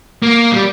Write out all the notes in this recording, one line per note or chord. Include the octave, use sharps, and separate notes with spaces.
A#3
G3